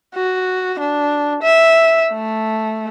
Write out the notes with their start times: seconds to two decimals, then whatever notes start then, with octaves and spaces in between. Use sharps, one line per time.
0.15 F#4
0.79 D4
1.43 E5
2.13 A3